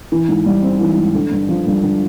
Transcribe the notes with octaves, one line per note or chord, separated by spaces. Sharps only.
E3
G#2
G3
C4
E3
G#2
D3
G2
F3
G2
D3